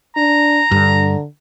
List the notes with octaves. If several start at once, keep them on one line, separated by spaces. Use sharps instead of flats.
D4 A#5
G2 D3